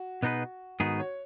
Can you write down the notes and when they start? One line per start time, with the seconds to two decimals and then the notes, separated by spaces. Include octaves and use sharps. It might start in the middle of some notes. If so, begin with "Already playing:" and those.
Already playing: F#4
0.23 B2 B3 D#4 G#4 B4
0.80 G#2 D#3 B3 D#4 F#4 G#4
1.00 C#5